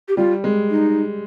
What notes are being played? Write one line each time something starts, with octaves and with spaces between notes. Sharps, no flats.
G4
G3 F4
G#3
D#4